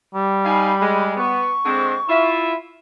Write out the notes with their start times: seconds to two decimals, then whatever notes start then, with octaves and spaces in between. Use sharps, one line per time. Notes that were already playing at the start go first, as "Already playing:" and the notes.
0.14 G3
0.45 D#4 F5 G#5 B5
0.80 G#3
1.17 B3 C#6
1.65 D3 G#3 C4
2.09 E4 F4 E5